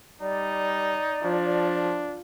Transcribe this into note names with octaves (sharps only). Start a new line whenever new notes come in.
G3 D#4 D5
F3 D4